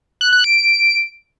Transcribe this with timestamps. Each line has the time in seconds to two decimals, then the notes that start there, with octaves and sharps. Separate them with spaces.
0.21 F#6
0.33 F#6
0.44 D7